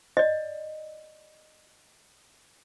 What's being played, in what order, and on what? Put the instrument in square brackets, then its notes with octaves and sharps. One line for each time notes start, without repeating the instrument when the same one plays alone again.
[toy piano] D5 D#5